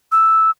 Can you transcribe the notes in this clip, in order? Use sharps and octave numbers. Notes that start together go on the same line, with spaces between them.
E6